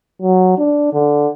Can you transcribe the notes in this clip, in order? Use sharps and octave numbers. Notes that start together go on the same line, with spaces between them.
F#3
D4
D3